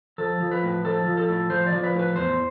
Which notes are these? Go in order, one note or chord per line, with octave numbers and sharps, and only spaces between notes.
F3 A4
F3
B4
A2
F3 A4
F3
A4
A2
F3 C5
D5
F3
B4
A2
B4
E2 C5